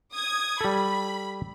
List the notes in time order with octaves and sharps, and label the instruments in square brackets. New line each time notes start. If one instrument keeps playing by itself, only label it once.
[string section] D#6 G#6
[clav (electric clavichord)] G3 A4 [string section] B5